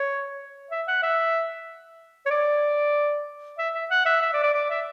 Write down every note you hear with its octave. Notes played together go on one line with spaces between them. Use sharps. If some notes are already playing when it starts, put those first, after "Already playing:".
Already playing: C#5
E5
F#5
E5
C#5
D5
E5
E5
F#5
E5
E5
D5
D5
D5
E5